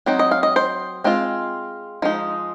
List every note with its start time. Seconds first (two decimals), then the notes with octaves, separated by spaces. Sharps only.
0.06 F#3 C4 D#4
0.19 D#5
0.31 F5
0.43 D#5
0.56 C5
1.04 G#3 C4 F4
2.02 F3 G#3 D#4